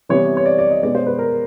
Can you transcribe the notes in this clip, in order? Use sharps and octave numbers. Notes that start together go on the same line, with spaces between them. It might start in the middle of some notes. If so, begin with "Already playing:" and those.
C3 E3 G3 B3 C#5
C#5
D5
D5
D#5
B2 G#3 B3 D5
C5
B4
A#4